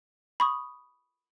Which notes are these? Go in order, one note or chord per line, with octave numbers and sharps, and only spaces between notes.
B5 C#6 D#6